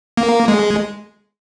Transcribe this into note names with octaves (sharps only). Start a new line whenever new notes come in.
A#3
G#3